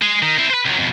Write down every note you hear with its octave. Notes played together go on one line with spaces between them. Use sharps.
G#3 G#4
D#3
C4 E4
B4 C5
C#2 F#3
F2 B2